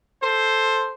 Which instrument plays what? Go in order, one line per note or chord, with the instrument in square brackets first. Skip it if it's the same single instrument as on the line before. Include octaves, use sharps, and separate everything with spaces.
[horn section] A4 C5